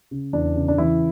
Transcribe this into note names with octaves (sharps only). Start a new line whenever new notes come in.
C#3
E2 D4
C#3
D4
E3 E4